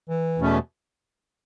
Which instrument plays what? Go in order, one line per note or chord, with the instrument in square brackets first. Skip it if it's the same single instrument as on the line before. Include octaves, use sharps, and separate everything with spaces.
[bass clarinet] E3
[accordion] E2 B2 A3 C#4